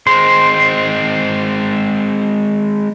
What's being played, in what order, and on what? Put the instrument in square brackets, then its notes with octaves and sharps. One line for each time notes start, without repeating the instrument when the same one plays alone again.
[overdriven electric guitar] G#3 C4 [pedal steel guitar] C5